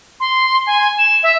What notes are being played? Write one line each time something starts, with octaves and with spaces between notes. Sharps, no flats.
C6
G#5
E7
E5